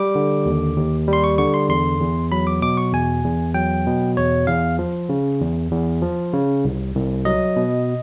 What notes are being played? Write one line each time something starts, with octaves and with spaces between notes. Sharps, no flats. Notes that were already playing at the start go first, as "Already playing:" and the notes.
Already playing: G3 D6
D3
D#2
D#2
G3
C6
C#6
D3 C#6
C6
E2 C6
E2
F#3 B5
D6
B2 D6
C#6
E2 G#5
E2
F#3 G5
B2
E2 C#5
E2 F5
F3
C#3
E2
E2
F3
C#3
C2
C2
F#3 D#5
B2